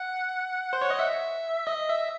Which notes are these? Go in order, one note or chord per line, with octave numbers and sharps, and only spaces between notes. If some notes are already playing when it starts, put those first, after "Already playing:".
Already playing: F#5
C5
C#5
D#5
E5
D#5
E5